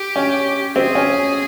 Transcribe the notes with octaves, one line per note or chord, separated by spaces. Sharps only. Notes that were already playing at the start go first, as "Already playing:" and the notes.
Already playing: G4
C#4
C4 G#4
C#4